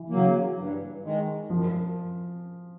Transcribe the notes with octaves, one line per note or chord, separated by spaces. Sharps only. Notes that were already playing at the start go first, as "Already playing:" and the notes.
Already playing: E3
C#3 F#3 A#3
G2
D#3 G#3
F#2 F3